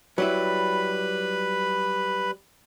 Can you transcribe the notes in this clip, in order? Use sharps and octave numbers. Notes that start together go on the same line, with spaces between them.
F#3 G3 E4 B4 B5